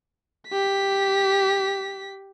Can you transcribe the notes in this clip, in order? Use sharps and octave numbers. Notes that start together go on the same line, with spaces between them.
G4 B6